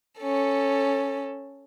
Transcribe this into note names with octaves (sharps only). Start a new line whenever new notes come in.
C#4 A4